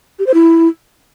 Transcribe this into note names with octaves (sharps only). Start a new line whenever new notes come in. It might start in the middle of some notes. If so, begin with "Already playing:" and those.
G4
C5
E4